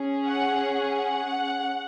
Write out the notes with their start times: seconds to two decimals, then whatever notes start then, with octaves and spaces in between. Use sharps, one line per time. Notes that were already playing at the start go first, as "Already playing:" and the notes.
Already playing: C#4 G#4
0.27 F#5
0.75 F#5